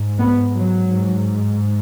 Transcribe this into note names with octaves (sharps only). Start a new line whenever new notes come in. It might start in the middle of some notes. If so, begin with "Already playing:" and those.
Already playing: G#2
B3
F#3
G#2